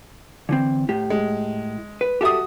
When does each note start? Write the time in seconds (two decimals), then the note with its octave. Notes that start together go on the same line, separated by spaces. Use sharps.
0.49 D3 E3 C4
0.89 A2 G4
1.10 G#3
2.01 B4
2.21 F#4 G4 A4 E5 D#6